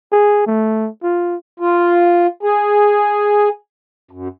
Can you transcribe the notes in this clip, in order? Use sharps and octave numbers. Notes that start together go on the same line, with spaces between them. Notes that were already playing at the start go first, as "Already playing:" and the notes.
G#4
A3
F4
F4
G#4
F#2